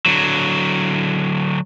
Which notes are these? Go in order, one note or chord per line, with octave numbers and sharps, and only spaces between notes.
D3 F#3